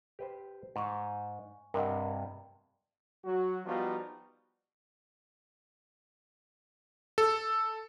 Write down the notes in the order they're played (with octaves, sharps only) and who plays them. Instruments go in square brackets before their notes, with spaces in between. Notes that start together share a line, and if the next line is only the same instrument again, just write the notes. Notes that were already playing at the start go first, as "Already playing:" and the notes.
[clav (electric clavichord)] G4 B4 C5
[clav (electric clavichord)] G#2 [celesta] G#5 C#6
[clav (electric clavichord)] G2 C3 [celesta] A#4 D#5 F#5
[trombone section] F#3 F#4
F3 G3 B3 D#4 F4 F#4
[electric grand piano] A4